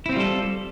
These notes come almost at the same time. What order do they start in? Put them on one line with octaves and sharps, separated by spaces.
E4 C4 F4 G3 A4